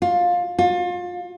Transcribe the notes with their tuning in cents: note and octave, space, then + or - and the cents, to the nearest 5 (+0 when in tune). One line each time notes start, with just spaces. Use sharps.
F4 +20
F4 +30